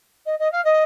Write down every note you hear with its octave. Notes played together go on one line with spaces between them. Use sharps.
D#5
D#5
F5
D#5